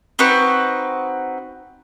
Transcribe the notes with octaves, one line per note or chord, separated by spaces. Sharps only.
C4 D#4 F#4 B4